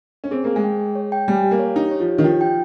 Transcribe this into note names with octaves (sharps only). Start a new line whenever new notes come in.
C#4
C4 G#4
A#3 G#4
G#3
G5
G#4
C#5
G5
G3 G#5
G4
A#3
C#5
D#4 G4
C#5
F3
G4
D#3
F3 G5
G5